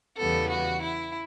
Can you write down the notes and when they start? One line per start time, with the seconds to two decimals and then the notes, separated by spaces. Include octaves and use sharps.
0.17 E2 C#3 E3 G3 B3 A4
0.50 F#4
0.82 E4